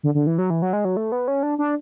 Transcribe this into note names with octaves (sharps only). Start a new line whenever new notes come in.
D3
D3
E3
F#3
E3
F#3
G#3
F#3
A3
B3
C#4
D4
D4